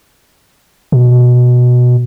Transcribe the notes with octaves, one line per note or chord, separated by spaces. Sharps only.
B2